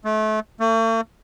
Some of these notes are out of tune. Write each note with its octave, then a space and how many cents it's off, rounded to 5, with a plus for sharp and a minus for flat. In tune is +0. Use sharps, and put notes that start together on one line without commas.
A3 -30
A3 +45